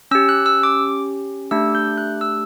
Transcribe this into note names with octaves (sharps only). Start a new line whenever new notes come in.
C#4 G4 E6
F#6
E6
D6
A3 D4 G4 E6
G6
F#6
E6